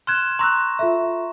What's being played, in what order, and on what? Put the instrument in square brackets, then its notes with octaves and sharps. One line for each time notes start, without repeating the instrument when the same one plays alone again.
[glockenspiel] C6 E7 [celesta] F6 F#6 G#6
[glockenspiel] A#5 C#6 A#6 [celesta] C6 E6 F#6
[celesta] F4 A4 E5